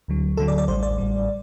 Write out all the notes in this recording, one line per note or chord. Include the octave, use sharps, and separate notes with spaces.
D2 D3 F#3
D2 D3 F#3 A4
D5
D5
A1 A2 G3 C5
D5
A1 A2 G3